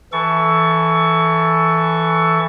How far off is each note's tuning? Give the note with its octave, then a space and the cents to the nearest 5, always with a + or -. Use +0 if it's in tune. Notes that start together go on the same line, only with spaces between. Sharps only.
E3 +0 A4 +0 C#6 +20